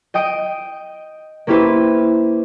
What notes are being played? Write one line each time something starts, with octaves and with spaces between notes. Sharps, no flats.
D#5 G5 D#6 D7
A#3 C#4 E4 G4 B4 C5